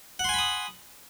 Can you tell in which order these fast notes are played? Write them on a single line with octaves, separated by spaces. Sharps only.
F#5 C6 G#5 B5 D#6